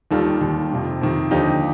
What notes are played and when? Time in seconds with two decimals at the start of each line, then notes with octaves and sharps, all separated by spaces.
0.11 D#2 D#3 G3 F4 A4
0.41 D#2 D#3 G3
0.71 F2 C3 D#3
1.01 F2 C3 D#3
1.31 D#2 D3 F3 D#4 G4